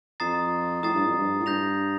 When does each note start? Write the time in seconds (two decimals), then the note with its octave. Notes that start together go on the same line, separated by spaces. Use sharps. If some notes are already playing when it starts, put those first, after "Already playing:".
0.20 F2 A#5 D#6 A6 C7
0.83 A2 A#5 D#6 A6 C7
0.94 G2
1.06 F2
1.18 G2
1.40 A2
1.45 G2 G6 A#6 F7